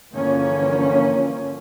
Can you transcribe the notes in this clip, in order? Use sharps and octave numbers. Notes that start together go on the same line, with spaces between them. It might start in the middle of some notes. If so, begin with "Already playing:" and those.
G2 D3 E3 F3 A#3 C#4